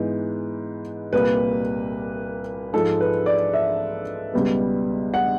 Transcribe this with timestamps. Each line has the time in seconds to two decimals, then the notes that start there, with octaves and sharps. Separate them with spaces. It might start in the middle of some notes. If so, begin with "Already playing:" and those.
Already playing: G#2 E3 G#3 B3
1.13 C2 A#2 G3 A#3 B4
2.73 G#2 F3 G#3 A4
3.00 B4
3.26 D5
3.54 E5
4.34 C#2 B2 G3 B3
5.14 F#5